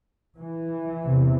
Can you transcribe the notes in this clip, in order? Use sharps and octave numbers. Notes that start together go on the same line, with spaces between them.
E3
E2 C3